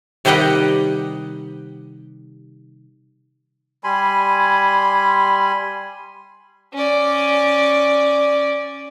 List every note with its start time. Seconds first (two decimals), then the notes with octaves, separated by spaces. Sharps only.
0.25 C3 D#3 G3 G4 D#5 F#5
3.84 G3 G#5 B5 C6
6.74 C#4 D5